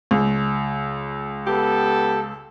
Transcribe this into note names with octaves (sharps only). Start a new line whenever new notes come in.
C#2
B3 G4 A4